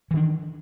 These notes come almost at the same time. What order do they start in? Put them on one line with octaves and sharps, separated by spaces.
E3 D#3 D4